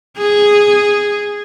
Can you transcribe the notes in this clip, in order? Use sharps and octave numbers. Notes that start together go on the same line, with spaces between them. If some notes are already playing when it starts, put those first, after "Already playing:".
G#4